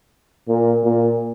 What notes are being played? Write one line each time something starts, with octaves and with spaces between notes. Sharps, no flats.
A#2
A#2